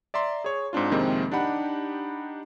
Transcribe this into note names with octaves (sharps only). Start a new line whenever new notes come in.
D5 E5 A#5 C6
G#4 C#5
G#2 C4 D4 F4
F2 C3 D#3 G#3 A#3 C4
D4 D#4 G4 F#5 B5